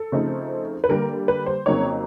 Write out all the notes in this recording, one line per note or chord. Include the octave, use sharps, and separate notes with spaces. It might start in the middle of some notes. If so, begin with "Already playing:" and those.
Already playing: A4
C#3 F3 A3 C4 D#4
B4
D3 G3 A#3 A#4
B4
C5
F2 C#3 F#3 A#3 D#4 C#5